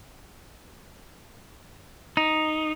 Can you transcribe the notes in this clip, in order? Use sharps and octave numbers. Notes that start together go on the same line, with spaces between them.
D#4